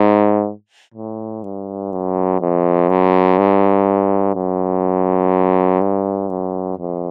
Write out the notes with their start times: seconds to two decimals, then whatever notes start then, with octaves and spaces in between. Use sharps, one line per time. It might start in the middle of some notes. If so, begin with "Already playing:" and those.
Already playing: G#2
0.94 A2
1.43 G2
1.92 F#2
2.40 F2
2.89 F#2
3.38 G2
4.35 F#2
5.81 G2
6.29 F#2
6.78 F2